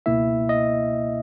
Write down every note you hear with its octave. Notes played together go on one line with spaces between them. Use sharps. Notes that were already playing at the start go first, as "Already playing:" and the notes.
C#2 B2 A#3 E4 E5
D#5